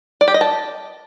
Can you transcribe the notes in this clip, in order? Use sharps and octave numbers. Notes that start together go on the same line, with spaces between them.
D5
G4
D#5
A5